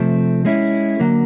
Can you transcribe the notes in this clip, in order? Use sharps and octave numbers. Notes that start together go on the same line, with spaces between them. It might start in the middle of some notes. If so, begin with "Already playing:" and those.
Already playing: C3 F3 A3 C4
G#3 C#4 E4
D3 F#3 A#3